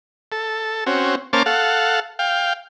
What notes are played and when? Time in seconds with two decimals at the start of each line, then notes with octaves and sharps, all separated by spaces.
0.32 A4
0.87 C4 C#4 F#4
1.33 A#3 C#4 C5 A5 D6 F6
1.46 A4 F5 F#5
2.19 F5 G5